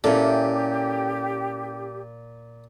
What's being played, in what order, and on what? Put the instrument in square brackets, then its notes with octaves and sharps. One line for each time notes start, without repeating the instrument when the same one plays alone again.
[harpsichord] A#2 [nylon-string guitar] C#4 E4 A4 [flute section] G4